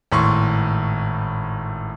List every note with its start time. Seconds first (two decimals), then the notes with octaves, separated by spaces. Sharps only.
0.12 G#1 A2 C6 C#6